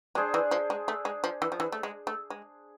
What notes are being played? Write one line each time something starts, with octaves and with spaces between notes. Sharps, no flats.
G#3 D4 G#4 C5
E3
F3
G#3
A3
G#3
F3
E3
F3
E3
A3
G#3
A3
G#3